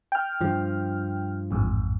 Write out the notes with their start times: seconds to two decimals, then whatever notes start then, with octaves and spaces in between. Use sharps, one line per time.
0.12 G5 F6
0.41 G2 F3
1.51 A1 F2 G#2